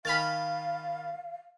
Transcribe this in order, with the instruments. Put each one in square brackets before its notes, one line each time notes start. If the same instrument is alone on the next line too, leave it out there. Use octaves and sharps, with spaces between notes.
[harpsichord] D#3 G5 G#5 [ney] F5 [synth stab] B5 F6 A6